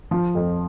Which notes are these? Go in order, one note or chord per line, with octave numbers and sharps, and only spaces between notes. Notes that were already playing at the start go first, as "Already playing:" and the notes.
F3
F2